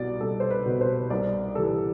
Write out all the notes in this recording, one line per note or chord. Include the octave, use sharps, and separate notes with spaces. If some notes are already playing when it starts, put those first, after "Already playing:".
Already playing: C2 B2 D5
C2 A4
C5
B4
B2
C5
C2 D5
C3 E3 A4